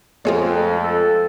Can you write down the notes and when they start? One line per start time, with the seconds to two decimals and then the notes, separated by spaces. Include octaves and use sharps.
0.25 F2 G#3 A3 F4 G#4 C#5
0.84 A4